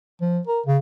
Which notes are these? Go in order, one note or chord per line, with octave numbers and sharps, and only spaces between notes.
F3
A#4
C#3